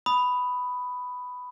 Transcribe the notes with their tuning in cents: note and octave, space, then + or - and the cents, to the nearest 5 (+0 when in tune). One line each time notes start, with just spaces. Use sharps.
B5 +5 D#6 +0